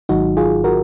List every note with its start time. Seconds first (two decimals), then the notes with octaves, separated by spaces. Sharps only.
0.09 G#1 G#2 D#3 F#3 D#4 F#4
0.37 F4 G#4
0.64 F#4 A#4